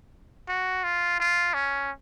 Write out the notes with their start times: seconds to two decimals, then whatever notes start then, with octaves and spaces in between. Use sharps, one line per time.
0.49 F#4
0.84 F4
1.20 F4
1.54 C#4